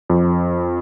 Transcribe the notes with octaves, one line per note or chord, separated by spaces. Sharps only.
F2